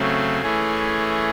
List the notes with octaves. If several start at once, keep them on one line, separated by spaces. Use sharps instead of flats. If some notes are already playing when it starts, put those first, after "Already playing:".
Already playing: C#3 F#3 A3 C4
E3 A3 C#4 G#4